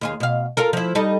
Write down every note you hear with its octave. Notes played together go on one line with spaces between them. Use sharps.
D#2 F4 G#4
B2 F5
F4 A4 A#4
F3 E4
G3 D#4 A4